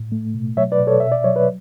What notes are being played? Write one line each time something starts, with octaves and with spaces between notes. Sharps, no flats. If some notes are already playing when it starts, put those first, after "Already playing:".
Already playing: A2
A3
B2
F#3 C#5 E5
B4 D5
B2
A4 C#5
B2 E5
D5
F#3 C#5
B4